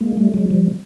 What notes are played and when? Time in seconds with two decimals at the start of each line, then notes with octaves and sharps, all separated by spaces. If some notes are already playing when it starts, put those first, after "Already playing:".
0.01 G#3 A#3
0.17 G3 A3
0.34 F#3 G#3
0.50 F3 G3